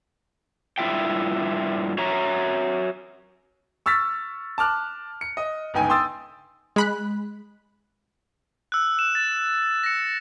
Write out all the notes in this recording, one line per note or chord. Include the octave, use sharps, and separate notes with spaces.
G2 E4 F4 E5 G5
F#4 C#5 E5 A#5
C#6 E6 F6 A6 B6
A5 D6 F6 F#6
C#7
D#5
G1 C#2 D#4 G5 G#5
G5 C6 D#6 E6 A6
G#3 B5 F#6
E6 F#6
E7
A6
A#6 C#7